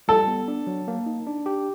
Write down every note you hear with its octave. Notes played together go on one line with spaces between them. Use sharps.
G3 A4
B3
D4
F#3
A#3
D#4
D4
G4